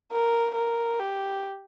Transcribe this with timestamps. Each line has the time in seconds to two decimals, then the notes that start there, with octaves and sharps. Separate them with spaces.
0.12 A#4
0.55 A#4
0.99 G4